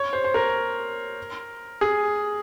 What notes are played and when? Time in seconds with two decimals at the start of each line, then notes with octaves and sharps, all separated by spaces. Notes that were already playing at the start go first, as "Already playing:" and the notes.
Already playing: C#5
0.13 C5
0.24 C5
0.34 A#4
1.81 G#4